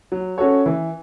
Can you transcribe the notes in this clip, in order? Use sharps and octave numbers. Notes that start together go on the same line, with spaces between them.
F#3
C#4 F#4 A4 C#5
E3